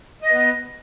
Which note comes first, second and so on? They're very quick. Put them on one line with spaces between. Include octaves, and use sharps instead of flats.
D#5 B4 B3